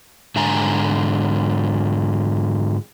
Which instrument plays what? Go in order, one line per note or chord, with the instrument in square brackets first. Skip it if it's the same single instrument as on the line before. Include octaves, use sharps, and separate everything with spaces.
[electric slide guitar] G#2 D3 E5 G#5 A#5